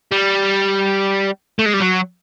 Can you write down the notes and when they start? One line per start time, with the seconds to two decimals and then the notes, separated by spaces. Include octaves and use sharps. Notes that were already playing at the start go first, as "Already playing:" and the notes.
0.11 G3
1.59 A3
1.66 G#3
1.74 G3
1.80 F#3